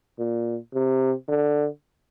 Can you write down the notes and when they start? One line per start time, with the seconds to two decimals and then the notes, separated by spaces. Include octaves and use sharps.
0.19 A#2
0.74 C3
1.28 D3